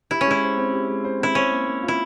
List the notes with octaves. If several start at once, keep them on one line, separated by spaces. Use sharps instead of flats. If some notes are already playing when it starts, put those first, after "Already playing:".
E4 G4
C#4
G#3 E4
C5
C4
G4
G#3
C5
C4 E4
C#4 C5
A#3
A#3
F4
E4